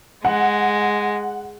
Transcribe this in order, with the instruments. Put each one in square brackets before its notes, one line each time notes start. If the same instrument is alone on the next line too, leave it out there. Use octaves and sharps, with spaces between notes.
[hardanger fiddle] G#3 [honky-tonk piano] F#5